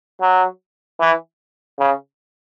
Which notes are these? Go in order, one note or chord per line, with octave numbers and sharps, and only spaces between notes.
F#3
E3
C#3